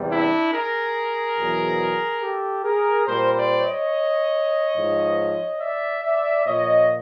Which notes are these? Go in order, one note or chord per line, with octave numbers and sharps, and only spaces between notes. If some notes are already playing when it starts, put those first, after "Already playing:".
Already playing: E2 C3 E3 G3
D4 E4
G#4 A#4
E2 B2 F#3
G4 A4
G#4 A#4
A#2 G3 A#4 C5
C5 D5
C#5 D#5
G#2 F3
D5 E5
D5 E5
A#2 F3 C#5 D#5